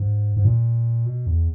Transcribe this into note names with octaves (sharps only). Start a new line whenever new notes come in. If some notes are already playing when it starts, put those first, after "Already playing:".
Already playing: G#2
G#2
A#2
B2
E2